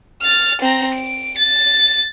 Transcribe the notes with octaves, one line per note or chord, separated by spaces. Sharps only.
F6 A6
C4 A#5
D7
A6